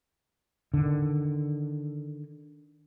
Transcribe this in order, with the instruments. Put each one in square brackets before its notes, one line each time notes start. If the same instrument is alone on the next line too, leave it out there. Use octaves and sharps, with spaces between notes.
[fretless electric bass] D3 D#3